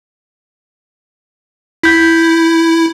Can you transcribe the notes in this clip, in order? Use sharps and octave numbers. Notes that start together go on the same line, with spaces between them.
E4 G6 B6